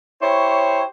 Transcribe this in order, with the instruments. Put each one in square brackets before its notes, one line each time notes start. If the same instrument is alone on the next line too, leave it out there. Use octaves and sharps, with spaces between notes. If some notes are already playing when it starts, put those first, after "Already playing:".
[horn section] E4 G4 C5 C#5